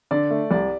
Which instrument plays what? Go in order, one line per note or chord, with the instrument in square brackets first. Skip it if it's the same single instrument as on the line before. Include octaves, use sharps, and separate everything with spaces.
[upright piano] D3 [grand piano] D5
[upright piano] A3
[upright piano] C2 [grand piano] D5